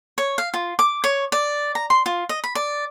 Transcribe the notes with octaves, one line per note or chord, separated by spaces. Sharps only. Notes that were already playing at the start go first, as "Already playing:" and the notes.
C#5
F5
F4
D6
C#5
D5
A#5
C6
F4
D#5
B5
D5